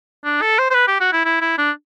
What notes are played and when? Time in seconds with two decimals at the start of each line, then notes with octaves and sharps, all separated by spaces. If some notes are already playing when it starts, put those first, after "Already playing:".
0.25 D4
0.41 A4
0.59 C5
0.71 C5
0.74 B4
0.87 G4
1.00 F#4
1.13 E4
1.25 E4
1.41 E4
1.58 D4